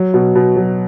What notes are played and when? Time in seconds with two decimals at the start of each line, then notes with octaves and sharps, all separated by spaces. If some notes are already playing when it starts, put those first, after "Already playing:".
Already playing: F#3
0.14 B2
0.35 B2
0.56 F#3